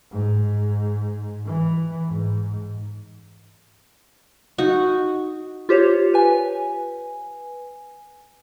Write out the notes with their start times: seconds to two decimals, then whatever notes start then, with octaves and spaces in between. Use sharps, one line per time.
0.11 G#2
1.45 E3
2.08 G#2
4.58 D#4 F#4
5.69 F4 G4 C5 C#5
6.14 B4 G#5